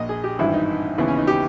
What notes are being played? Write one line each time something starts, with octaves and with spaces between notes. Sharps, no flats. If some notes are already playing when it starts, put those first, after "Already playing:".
Already playing: A#1 A#2 D#5
G#4
G4
G#1 G2 E3 E4
D#4
D#2 C#3 E3 B3
C#4
D#4
G4